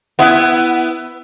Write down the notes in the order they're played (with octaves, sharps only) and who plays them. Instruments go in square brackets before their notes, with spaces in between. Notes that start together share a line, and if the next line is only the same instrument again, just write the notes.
[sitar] B3 E4